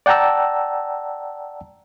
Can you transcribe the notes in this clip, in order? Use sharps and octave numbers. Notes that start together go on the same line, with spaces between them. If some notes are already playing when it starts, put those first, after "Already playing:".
D5 F#5 G5 A5 A#5 E6